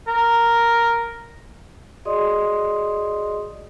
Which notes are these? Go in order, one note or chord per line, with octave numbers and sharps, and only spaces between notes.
A#4
F#4 G#4 D5 D#5 C6 D#6